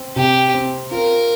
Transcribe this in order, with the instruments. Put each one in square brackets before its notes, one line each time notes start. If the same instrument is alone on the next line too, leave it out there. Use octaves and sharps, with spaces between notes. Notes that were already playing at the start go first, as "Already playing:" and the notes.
Already playing: [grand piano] C4
[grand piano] C3 [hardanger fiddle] G4
[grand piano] C4
[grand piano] F4 [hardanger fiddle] A#4